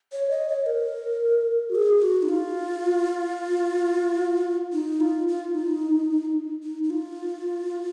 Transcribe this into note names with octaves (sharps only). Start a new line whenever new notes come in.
C#5
D#5
C#5
A#4
F#4
G#4
F#4
D#4
F4
D#4
F4
F4
D#4
D#4
D#4
F4